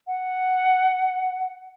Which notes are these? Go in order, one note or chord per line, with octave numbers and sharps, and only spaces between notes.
F#5